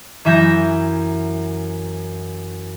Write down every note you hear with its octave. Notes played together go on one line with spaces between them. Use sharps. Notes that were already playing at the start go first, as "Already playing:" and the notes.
F#2 E3 E5 A#5 G6 A#6